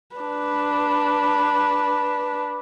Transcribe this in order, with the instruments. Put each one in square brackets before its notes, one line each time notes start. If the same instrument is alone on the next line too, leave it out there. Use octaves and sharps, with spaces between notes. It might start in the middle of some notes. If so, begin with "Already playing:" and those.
[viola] D4 B4